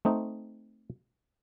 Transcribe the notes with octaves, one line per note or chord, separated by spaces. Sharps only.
A3 C4 D#4